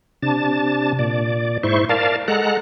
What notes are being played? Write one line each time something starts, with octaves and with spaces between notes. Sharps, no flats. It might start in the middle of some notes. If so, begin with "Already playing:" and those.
C3 D4 A5
A#2 D5
G#2 E4 C5 C#6
A#4 D5 F5 A5
G#3 A4 F#5 A#5 F#6